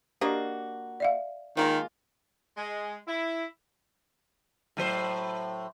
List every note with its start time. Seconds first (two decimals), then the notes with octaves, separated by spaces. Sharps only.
0.21 A#3 D4 F#4 G4 D#5
1.00 D5 E5 F5
1.57 D#3 G#3 A#3 F4
2.57 G#3
3.07 E4
4.77 A2 F#3 C5